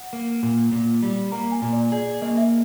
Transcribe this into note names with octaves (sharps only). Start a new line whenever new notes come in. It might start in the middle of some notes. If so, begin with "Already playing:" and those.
Already playing: F#5
A#3
A#2
A#2
G3
A#3 A#5
G#5
A#2
D5
G#4 D5
D5
A#3 D#5
E5